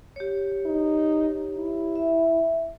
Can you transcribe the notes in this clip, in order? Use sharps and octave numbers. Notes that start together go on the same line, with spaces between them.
G4 C#5
D#4
E4
E5